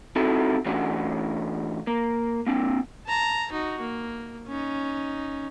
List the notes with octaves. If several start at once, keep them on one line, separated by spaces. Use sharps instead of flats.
C4 D#4 E4 F#4 A4
E3 A3 C#4 D4 F#4
A#3
A#3 C4 D4
A5 A#5
D#4 F#4
A#3
C#4 D#4